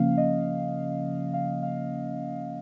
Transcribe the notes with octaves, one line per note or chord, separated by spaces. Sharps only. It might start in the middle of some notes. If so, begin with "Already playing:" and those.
Already playing: C#3 F3 A#3 C#4 F5
D#5
F5
F5